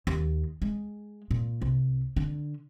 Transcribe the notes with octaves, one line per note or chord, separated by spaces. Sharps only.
D#2
G#3
A#2
C2
D3